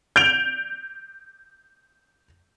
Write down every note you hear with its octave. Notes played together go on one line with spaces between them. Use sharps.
G6 D7 F7